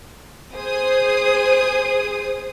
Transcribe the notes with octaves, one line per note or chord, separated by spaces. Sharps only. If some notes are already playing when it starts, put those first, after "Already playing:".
G#4 C5 D#6 C7